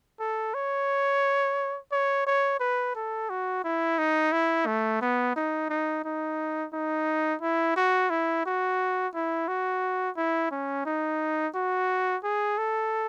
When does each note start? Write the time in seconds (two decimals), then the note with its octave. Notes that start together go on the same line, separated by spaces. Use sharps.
0.20 A4
0.54 C#5
1.92 C#5
2.27 C#5
2.60 B4
2.95 A4
3.30 F#4
3.64 E4
3.99 D#4
4.32 E4
4.67 A3
5.02 B3
5.36 D#4
5.70 D#4
6.04 D#4
6.73 D#4
7.41 E4
7.76 F#4
8.10 E4
8.46 F#4
9.15 E4
9.48 F#4
10.17 E4
10.52 C#4
10.86 D#4
11.55 F#4
12.24 G#4
12.58 A4